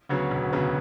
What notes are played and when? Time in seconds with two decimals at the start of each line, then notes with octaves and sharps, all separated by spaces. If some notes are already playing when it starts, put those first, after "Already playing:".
0.09 D2 C#3 F#3 B3
0.31 E1
0.53 D2 C#3 F#3 B3